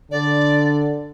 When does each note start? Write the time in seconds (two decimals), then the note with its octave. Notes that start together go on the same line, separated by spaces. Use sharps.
0.11 D3 D5